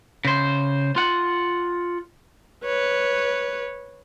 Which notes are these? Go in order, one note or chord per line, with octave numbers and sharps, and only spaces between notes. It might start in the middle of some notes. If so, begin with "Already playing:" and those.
C#3 C5
F4 F#5
B4 C#5